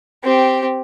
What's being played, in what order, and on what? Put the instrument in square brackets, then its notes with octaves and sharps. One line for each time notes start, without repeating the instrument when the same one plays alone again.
[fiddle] C4 G4